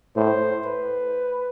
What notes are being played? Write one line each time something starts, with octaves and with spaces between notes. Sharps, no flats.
A2 C5
B4